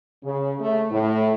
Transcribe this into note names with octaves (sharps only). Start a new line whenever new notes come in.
C#3
A3
A2